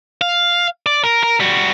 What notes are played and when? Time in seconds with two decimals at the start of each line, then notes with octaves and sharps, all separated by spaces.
0.21 F5
0.86 D5
1.04 A#4
1.23 A#4
1.40 G3 F#4